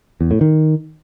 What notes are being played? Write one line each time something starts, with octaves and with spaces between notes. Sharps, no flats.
E2
A2
D#3